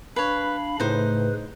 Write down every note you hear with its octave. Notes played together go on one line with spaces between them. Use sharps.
D4 B4 C#5 F5 B5
A2 C#3 D#4 B4 C5